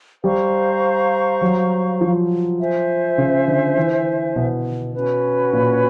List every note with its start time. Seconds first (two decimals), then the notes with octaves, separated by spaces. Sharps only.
0.24 G3 C5 F5 A#5 C#6
1.41 F#3
2.01 F3
2.59 C5 E5 G#5
3.18 C#3
3.48 D3
3.77 E3
4.36 B2
4.94 C#4 F#4 B4
5.53 A#2